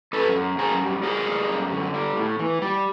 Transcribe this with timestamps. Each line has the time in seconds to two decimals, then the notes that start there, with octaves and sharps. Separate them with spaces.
0.13 F#2 A4 B4
0.36 F#2
0.58 F#2 G#4 A#4
0.81 G3
1.03 G3 G#4 A#4
1.26 G3
1.49 F#2
1.72 D3
1.94 G3
2.17 A2
2.39 E3
2.62 G3